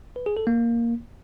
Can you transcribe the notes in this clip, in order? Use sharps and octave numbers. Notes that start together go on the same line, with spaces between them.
B4
G#4
A4
A#3